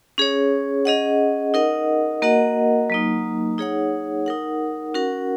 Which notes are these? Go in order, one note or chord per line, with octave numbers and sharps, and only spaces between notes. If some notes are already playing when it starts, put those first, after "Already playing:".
C#4 G#4 C#5
C#4 G#4 D#5 F#5
D#4 A#4 D#5 F#5
A#3 F#4 A#4 D#5 F#5
F#3 A#3 D#4
D#4 G#4 C#5 F#5
D#4 A#4 F#5
C#4 F#4 A#4 F#5